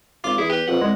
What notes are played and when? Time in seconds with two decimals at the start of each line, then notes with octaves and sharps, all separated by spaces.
0.24 G#1 F4 D6
0.39 E2 E4 G#4
0.50 G4 B4
0.68 F2 F#5
0.81 C2 G#3